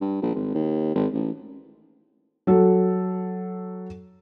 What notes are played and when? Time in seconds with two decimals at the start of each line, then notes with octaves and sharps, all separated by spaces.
0.01 G2
0.22 A#1
0.35 G#1
0.54 D#2
0.95 G#1
1.13 A1
2.47 F#3 A4